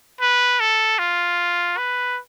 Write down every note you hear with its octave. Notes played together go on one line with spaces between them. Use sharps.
B4
A4
F4
B4